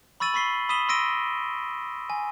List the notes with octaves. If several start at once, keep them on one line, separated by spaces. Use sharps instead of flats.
B5 C#6 E6 A6 D#7 F#7
B5 C#6 B6 C7 G7
B5 D#6 B6 D#7 E7 G7
C6 E6 A#6 D7 D#7 G7
G#5